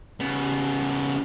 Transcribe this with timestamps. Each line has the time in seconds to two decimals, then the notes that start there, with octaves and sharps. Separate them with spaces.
0.20 C#3 B3